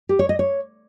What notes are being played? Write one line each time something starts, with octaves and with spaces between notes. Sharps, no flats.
G4
C#5
D#5
C#5